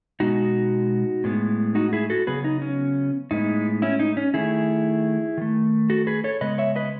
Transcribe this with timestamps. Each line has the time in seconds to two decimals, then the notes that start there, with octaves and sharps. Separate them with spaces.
0.20 B2 G#3 B3 D#4 F#4
1.24 A2 G#3 B3
1.75 D#4 F#4
1.93 E4 G#4
2.10 F#4 A4
2.27 C#3 F#3 B3 G#4 B4
2.44 D#4
2.62 C#4
3.31 A2 G#3 B3 D#4
3.82 C#4 E4
4.00 D#4
4.17 C#4
4.34 D#3 A3 E4 G#4
5.38 D#3 A3
5.90 F#4 A4
6.07 G#4 B4
6.24 A4 C#5
6.41 C#3 G#3 B3 B4 D#5
6.58 C#5 E5
6.76 B4 D#5